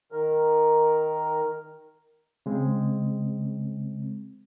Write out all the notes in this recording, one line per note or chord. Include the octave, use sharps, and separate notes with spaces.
D#3 A#4
C#3 G#3 C4